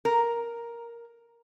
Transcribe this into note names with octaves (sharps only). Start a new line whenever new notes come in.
A#4